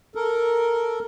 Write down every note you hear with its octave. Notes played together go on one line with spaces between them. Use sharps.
A4 A#4